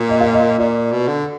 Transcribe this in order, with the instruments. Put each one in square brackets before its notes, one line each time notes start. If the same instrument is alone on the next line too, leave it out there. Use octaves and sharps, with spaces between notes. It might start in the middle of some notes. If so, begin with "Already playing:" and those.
Already playing: [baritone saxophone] A#2
[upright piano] D#5
F5
D#5
[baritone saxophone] A#2 [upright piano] D5
[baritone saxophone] B2
D3